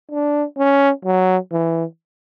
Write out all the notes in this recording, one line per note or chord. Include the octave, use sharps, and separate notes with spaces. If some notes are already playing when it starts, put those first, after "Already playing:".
D4
C#4
F#3
E3